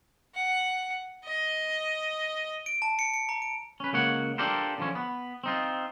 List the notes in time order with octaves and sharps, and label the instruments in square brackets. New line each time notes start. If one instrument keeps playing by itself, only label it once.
[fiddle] F#5
D#5
[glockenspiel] D7
A5
C#7
C#7
A#5
D7
[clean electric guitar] C#4 B4
C#2 A#3 C#5 F#5
D4 F4 G4 A4 A#4 C5
D3 F3 C#4
B3
C4 D#4 F4